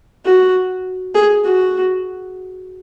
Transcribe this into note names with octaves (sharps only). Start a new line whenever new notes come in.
F#4
G#4
F#4